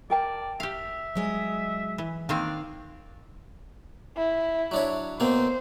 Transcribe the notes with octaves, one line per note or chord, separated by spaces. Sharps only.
A#4 D5 G5 A5
G4 E5 F5
F#3 G#3 D#5
E3
D#3 A#3 C4 D4 F5
E4
F#3 D4 C#5
B2 A#3 C4 C5